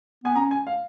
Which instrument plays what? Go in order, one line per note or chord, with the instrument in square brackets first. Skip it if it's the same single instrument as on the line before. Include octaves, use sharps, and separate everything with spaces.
[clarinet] B3 [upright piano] G#5
[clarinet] C#4 [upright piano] A#5
[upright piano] G#5
F5